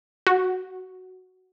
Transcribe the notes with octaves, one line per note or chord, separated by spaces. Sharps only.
F#4